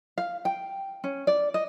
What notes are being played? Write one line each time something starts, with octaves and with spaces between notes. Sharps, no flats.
F5
G5
C#4
D5
D#5